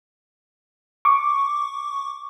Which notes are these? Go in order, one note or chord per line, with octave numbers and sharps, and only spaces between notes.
C#6 D6